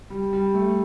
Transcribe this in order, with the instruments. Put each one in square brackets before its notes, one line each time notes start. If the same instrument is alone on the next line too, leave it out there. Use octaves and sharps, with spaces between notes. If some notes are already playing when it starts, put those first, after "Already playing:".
[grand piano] G3
G3
A3